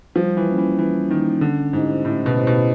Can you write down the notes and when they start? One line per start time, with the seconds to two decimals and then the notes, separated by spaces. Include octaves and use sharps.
0.15 F3 G3
0.37 E3
0.47 A#3 C#4
0.58 E3
0.78 E3 G3
1.10 D#3 A#3 C#4
1.41 D3 C#4
1.73 G#2 E4 G4 C5 D#5
2.04 A2 C#4
2.26 B2
2.37 E4 G4 C5 D#5
2.47 B2